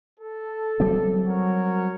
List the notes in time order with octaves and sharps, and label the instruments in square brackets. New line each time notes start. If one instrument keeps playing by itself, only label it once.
[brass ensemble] A4
[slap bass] F#3 G3 C4
[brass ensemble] F#4 A#4 C#5